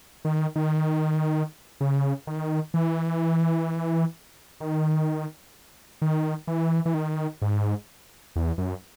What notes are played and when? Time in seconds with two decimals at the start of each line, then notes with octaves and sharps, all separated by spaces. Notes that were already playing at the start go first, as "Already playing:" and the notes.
0.25 D#3
0.56 D#3
1.81 C#3
2.27 D#3
2.74 E3
4.60 D#3
6.02 D#3
6.47 E3
6.86 E3
6.94 D#3
7.42 G#2
8.36 E2
8.58 F#2